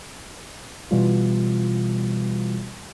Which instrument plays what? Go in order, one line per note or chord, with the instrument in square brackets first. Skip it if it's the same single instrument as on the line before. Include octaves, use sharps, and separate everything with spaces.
[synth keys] B2 E3 G3 F4